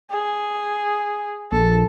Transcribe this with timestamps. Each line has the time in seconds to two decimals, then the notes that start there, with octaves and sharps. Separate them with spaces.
0.11 G#4
1.52 A#1 A4